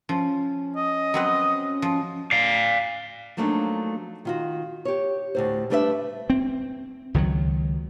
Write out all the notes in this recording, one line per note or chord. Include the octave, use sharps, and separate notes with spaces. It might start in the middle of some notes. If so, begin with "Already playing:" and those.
F3 C#4
D#5
F#3 C4 B4
F3
D5 F5
F3 F#3 A3 A#3 D4 D#4
D#3 F4 F#4
G4 C#5
D2 A2 C5
G3 A3 D4 B4 D5 E5
C4
C#2 D#3 E3 F#3